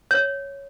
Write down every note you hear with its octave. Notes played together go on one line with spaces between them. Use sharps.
C#5